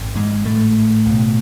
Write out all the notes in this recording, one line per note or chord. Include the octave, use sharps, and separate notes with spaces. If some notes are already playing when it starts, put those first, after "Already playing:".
Already playing: G#1
G#2 G#3
A2 A3
C#2 B2